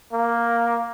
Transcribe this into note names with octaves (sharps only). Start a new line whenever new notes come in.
A#3